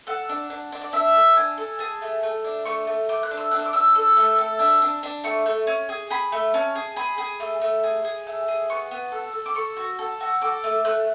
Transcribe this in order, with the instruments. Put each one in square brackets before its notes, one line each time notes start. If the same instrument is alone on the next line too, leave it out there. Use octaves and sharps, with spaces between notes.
[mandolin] A4 F#5
D4
D4
D4
D5
D4 E5
A4
D4 G#5
A4
G#4 A5
A3
A3
D4
A3 C#6
A3
A3 D6
F#6
D4
E6
D4 F#6
E6
D6
D4 E6
A4 E6
A3
A4
D4
D4
D4
A3 C#6
A3
C#4
G#4
G#4 B5
A3
C#4 A5
G#4
G#4 B5
G#4
A3
A3
G#4
G#4
A3
G#4
B3 C#6
B3
A4
A4
D6
A4 C#6
F#4
A4
F#4
A4 D6
A3
A3 F#6